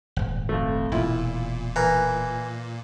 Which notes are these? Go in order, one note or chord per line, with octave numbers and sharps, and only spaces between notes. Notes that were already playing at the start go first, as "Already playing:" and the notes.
D#1 G#1
F2 A3
E1 A#2 E4 F4
E3 A#4